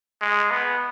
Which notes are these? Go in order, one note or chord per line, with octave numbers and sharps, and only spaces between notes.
G#3
B3